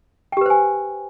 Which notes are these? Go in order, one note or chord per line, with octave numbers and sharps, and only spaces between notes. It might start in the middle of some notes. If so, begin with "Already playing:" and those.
G4 B4 C5 G5 G#5